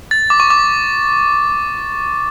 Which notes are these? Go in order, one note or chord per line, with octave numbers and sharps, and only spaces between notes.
A6
D6
C#6
D6